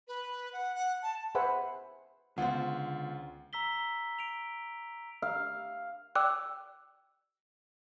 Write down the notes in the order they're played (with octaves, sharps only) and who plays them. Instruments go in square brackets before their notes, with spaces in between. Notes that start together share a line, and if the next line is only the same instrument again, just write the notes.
[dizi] B4
F#5
F#5
A5
[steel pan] G#4 B4 C5 E5 F#5 G#5
[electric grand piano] C#2 F4 [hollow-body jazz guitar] D3 B3 C5 [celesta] F#5
[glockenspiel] A#5 E6 B6 G7
D7 F7
[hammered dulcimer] F5
[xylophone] D5 G5 D6 E6 F#6